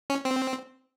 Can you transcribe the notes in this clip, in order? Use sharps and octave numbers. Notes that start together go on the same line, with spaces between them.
C#4
C4